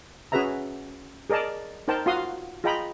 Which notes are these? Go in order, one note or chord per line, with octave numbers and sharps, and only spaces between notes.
C#4 F#4 G#4 B4 E5 A#5
G#4 A#4 D5 D#5 A5
D#4 A#4 C5 G5 A5
F4 F#4 F5 C6 D#6
F4 G#4 D#5 G5 A#5 B5